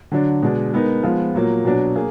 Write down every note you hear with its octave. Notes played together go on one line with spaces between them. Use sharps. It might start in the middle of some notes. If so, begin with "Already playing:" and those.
D3 F#3 D4
B2 G#3 D4
G#3 B3 D#4 A#4
F3 G#3 B3 F4
A#2 F#3 A#3
B2 F#3 D4
A#3 G#4